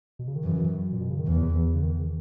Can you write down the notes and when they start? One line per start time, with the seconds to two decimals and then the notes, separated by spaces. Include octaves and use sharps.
0.19 B2
0.28 C#3
0.36 D#3
0.45 F#2 E3
0.92 A#2
1.00 B2
1.10 C#3
1.19 D#3
1.28 E2 E3
1.55 E3
1.74 C#3
1.83 D#3